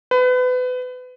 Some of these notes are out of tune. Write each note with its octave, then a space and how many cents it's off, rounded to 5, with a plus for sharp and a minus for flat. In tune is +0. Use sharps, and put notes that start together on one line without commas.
B4 +30